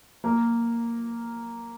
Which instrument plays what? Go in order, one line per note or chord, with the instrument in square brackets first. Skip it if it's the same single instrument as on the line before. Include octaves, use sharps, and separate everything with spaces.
[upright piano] A#3 A#4